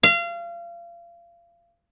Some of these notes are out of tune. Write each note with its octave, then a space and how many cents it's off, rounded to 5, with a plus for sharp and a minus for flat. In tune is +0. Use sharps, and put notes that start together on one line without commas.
F5 -30